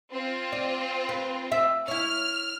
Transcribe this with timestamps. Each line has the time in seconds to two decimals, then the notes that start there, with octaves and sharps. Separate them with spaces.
0.11 C4 F4
0.52 D5
1.09 B4
1.52 E5
1.88 E4 C#5 F6